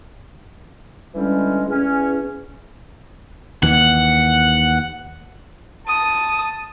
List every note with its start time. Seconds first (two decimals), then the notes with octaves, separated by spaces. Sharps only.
1.15 D3 E3 G3 G#3 C#4
1.68 E2 C#4
3.63 D#2 E3 F#5
5.88 A5 D#6